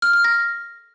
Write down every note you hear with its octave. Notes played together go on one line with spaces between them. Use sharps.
F6
F6
A#6